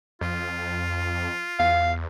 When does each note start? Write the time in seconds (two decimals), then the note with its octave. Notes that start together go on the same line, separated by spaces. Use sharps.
0.21 F2 F4
1.59 E2 F5